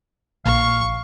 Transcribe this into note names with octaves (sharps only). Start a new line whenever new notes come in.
A#1 F5 C#6